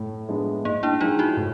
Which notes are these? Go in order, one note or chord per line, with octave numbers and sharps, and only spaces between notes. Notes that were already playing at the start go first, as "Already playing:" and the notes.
Already playing: A2
F3 G#3 B3 D4
G#2 A#3
D4 E4
F3 G#3 D#4 F4
E4 F#4
A2